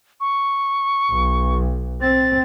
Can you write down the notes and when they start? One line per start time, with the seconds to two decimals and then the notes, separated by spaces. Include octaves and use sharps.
0.20 C#6
1.11 B1
2.02 C4 A6